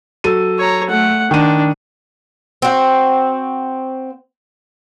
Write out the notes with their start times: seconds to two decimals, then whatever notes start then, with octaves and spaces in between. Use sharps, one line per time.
0.24 F#3 A4 D#7
0.59 C#5 A#5
0.89 A3 F#5
1.31 D#3 D4 D#7
2.62 C4 F#4